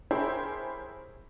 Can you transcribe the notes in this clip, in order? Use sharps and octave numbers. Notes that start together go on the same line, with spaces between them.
E4 G4 G#4 A#4 C5 C#5